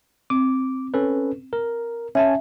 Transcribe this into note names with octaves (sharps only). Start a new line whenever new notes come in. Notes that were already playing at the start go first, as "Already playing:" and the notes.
C4 D6
C#4 A4 B4
A#4
C#4 E5 G#5 A5